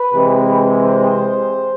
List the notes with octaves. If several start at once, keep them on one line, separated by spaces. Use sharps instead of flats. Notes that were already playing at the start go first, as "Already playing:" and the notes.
Already playing: B4
C3 E3 G#3 C4
C5